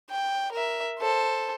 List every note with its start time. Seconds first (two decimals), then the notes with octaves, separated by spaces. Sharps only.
0.11 G5
0.52 A#4 E5
1.00 A4 C5